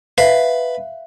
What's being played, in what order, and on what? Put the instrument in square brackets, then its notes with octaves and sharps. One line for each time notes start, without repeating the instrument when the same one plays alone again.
[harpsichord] B4 [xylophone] E5 F5